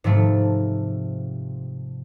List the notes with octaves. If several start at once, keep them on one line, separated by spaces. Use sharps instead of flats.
G#2 C3 F3 A3